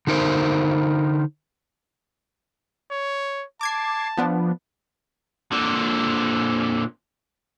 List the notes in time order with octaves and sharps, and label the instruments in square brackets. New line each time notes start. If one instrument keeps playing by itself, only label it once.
[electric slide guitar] D3 D#4 A#4 C5
[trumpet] C#5
[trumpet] A5 [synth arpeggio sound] D6 G#6 C7
[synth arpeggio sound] F3 B3 D4
[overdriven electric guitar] A#2 D3